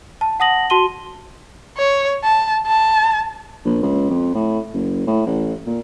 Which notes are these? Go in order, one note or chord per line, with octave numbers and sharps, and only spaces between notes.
A5
F#5 A5 D#6 A#6 F#7
F#4 A5 C6 D#7 G7
C#5
A5
A5
A#1
C#2
F2
A2
F#1
A2
A1
A#2